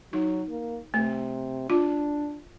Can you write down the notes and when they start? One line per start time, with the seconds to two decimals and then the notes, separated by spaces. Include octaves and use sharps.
0.13 F#3 D#4
0.49 A#3
0.94 C3 A3
1.70 D4 F4